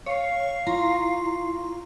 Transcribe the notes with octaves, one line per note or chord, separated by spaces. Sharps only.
C#5 F5 C#6
E4 F4 A#5 C6 C#6